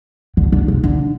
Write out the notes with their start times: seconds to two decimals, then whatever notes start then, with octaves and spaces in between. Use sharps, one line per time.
0.37 D3
0.52 D3
0.68 C3
0.84 D3